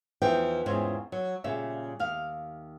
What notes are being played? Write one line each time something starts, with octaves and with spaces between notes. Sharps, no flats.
E2 E3 F3 D#4 G5
E2 G#2 C#3 C4 F4
F#3
A#2 C#3 G3 E5
D#2 F5